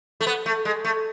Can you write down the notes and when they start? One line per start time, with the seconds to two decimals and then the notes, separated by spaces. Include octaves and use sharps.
0.21 A3
0.27 B3
0.46 A3
0.65 G#3
0.84 A3